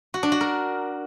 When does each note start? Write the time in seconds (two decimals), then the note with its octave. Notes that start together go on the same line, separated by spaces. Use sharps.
0.14 F#4
0.23 D4
0.32 F#4
0.41 A#4